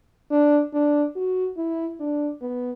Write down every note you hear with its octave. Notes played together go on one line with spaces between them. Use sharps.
D4
D4
F#4
E4
D4
B3